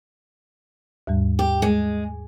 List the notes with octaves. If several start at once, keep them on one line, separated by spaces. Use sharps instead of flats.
D#2 G#2 G3
G4
G#3